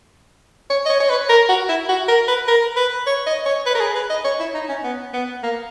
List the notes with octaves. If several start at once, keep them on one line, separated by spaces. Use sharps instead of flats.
C#5
D#5
C#5
C#5
B4
A#4
F#4
E4
F#4
A#4
B4
A#4
B4
C#5
D#5
C#5
B4
A#4
G#4
B4
D#5
C#5
E4
D#4
C#4
B3
B3
A#3